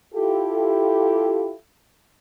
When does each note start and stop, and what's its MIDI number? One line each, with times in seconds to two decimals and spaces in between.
0.14 1.53 64
0.14 1.53 65
0.14 1.53 67
0.14 1.53 69